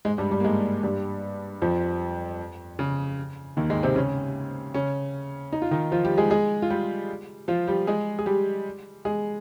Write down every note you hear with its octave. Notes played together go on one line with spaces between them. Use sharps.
G#2 G#3
G2 G3
G2 G3
A#3
G#2 G#3
G2 G3
F2 F3
C#3
D#2 D#3
G#2 G#3
C3 C4
C#3 C#4
C#3 C#4
D#4
F4
D#3 D#4
F3 F4
G3 G4
G#3 G#4
G#3 G#4
F4
G3 G4
F3 F4
G3 G4
G#3 G#4
G#4
G3 G4
G#3 G#4